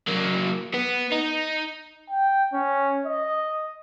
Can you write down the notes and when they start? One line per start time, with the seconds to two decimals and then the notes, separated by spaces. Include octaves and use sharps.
0.08 F#3 A#3
0.74 B3
1.12 D#4
2.10 G5
2.53 C#4
3.06 D#5